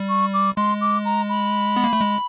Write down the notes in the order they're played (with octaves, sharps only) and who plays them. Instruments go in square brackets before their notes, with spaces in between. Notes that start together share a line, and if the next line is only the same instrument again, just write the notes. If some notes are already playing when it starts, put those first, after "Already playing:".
Already playing: [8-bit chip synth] G3
[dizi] C#6
D6
[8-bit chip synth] G#3 [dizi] C6
[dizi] D6
A#5
B5
[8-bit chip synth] B3
A#3
A3
G#3